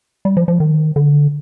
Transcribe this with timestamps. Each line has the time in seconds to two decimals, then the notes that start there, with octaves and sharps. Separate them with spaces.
0.25 G3
0.37 F3
0.48 F3
0.60 D#3
0.96 D3